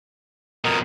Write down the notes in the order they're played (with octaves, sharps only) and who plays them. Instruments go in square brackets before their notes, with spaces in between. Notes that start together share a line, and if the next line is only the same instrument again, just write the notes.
[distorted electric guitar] F2 B2 [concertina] A#4 D#6